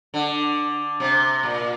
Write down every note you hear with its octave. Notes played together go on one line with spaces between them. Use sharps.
D3
C3
A#2